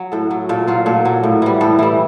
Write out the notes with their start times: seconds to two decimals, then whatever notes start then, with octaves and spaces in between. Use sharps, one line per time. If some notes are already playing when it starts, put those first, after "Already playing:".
Already playing: F#3
0.12 A2 A4
0.31 F#3
0.49 A#2 A4
0.67 F#3 F4
0.86 A#2 A4
1.05 F#3
1.23 A2
1.42 E3 G3
1.61 A2 A4
1.79 E3 G3